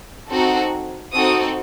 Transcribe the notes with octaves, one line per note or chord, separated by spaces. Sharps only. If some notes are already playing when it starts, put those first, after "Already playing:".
C4 D#4 F#4 A4
C4 D#4 F#4 A4 D#6